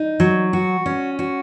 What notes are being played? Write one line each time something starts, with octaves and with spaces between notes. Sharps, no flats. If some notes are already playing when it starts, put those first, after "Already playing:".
Already playing: D#4
F#3
F#4
C#4
F#4